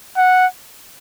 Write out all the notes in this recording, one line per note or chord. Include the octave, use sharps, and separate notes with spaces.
F#5